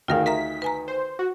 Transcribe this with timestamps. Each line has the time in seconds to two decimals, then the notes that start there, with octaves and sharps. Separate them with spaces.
0.08 D2 D#3 F4 G#4 A#4 F5
0.26 A#4 E5 A#5 B6
0.62 B4 G#5 A#5
0.88 C5
1.19 F#4